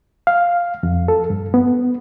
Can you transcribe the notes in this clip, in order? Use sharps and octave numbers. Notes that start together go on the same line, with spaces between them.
F5
F2
A4
G2
B3